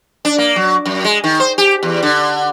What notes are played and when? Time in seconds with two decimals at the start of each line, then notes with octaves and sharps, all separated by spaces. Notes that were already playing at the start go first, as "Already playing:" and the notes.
0.25 D4
0.38 A#3
0.56 F#3
0.86 F#2
1.04 G#3
1.24 D#3
1.40 C5
1.58 G4
1.83 E2
2.03 D3